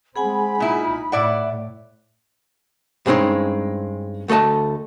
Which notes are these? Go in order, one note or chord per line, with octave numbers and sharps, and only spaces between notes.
G#3 C4 G#4 F#5 G#5 B5
A#2 D#4 E4
A2 E4 D5 E5 F#5
G2 G3 G#3 C4 C#4 D#4
D2 A3 A4 D#5 A5